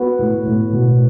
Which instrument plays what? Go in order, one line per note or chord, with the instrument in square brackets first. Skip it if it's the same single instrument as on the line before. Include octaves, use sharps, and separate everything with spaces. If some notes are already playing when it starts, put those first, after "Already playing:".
Already playing: [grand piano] B3 F#4 B4
A2
A2
B2